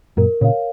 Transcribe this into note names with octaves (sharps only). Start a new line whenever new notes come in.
F#2 A#2 A#4
A#2 C#3 C#5 F5